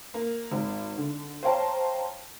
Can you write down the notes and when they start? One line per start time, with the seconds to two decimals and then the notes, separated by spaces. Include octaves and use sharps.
0.14 A#3
0.51 G#1
0.97 D3
1.43 C5 C#5 F5 G5 A5 A#5